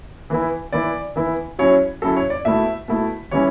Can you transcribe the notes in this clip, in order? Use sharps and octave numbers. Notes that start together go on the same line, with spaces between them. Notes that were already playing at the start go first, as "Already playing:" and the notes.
E3 B3 E4
E3 B3 E4 D5
E3 B3 E4
F#3 C#4 E4 C#5
F#3 C#4 E4 A4
C#5
D5
B2 A3 E4 E5
B2 A3 E4
E3 G3 C#4 E4 C#5